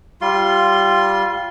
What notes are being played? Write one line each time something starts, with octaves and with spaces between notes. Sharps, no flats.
G3 F4 C6